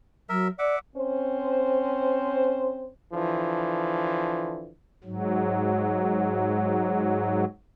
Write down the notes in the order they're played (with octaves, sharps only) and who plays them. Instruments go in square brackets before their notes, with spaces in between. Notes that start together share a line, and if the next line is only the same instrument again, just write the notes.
[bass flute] F#3 [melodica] A#4 E5
[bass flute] D5 [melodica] E5 F#5 D6
[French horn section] C4 C#4 C5
[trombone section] D3 E3 F3
[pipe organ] G#2 F#3